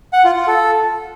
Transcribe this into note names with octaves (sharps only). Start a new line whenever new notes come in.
F#5
F4
F4
A4